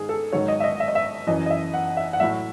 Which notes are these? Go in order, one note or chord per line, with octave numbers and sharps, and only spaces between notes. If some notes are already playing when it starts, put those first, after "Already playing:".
Already playing: G#2 D#3 G#4
A4
G#2 D#3 F#3 C#5
D#5
E5
D#5
E5
D#5
E5
F#2 E3 D#5
D#5
E5
F#5
E5
F#5
A2 F#3 E5